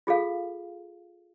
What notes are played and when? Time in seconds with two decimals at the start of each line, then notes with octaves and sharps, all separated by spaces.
0.07 F4 G#4 A4 F5